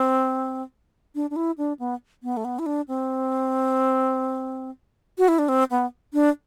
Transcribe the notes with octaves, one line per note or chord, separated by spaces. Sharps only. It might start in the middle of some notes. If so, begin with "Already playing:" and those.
Already playing: C4
D4
D4
E4
D4
B3
B3
A3
B3
E4
D4
C4
F#4
E4
D4
C4
B3
D4